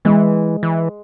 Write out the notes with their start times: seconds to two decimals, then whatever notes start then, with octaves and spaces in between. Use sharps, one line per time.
0.05 E3 G#3
0.63 E3